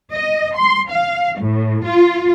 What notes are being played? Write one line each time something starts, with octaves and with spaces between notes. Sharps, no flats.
D#5
C6
F5
A2
F4